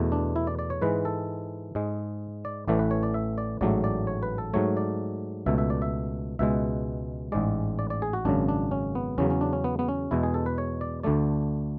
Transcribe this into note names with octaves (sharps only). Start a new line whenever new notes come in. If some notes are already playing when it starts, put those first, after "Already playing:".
Already playing: E2 B2 A3
D4
E4
D5
D5
C#5
G#2 E3 G#3 B4
A4
G#2 G#3
D5
A1 A2 E3 A3 D5
B4
C#5
D5
E5
D5
A1 G#2 F#3 A3 D5
D5
C#5
B4
A4
G#2 F#3 A3 C#5
D5
C#2 B2 A3 E5
E5
D5
E5
C#2 B2 G#3 E5
A1 G#2 G#3 D5
D5
D5
G#4
F#4
G#1 F#2 C#3 D4
D4
C#4
B3
E2 C#3 F#3 C#4
C#4
D4
C#4
B3
B3
C#4
E2 B2 G#3 E4
G#4
A4
B4
C#5
D5
D2 D3 A3 D5